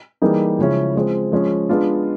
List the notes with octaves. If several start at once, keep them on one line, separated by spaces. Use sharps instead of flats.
E3 G3 A#3 D#4 G#4
C#3 F3 G#3 C#4 E4
F3 G#3 C4
F3 G#3 C#4
G#3 B3 D4 F4